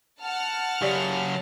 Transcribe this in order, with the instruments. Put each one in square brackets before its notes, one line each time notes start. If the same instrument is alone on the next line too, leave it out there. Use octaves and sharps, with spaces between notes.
[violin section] F#5 A5 F6
[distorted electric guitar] F#2 C#3 [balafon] G4 D5